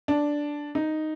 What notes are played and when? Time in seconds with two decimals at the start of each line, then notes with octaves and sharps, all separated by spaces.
0.08 D4
0.75 D#4